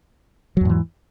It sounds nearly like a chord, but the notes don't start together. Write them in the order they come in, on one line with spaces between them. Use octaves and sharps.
F#3 E2 G#2 E3